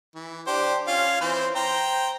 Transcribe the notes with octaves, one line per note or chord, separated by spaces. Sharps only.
E3
D4 G4 C5
C#4 F4 F5
E3 C4 C5
C5 G5 A#5